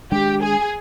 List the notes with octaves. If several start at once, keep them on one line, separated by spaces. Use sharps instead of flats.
D#3 G#3 D4 G4
G#4